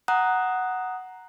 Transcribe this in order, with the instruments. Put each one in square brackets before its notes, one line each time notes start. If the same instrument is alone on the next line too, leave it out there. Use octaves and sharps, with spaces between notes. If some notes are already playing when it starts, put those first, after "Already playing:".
[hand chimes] F#5 A#5 D#6 F#6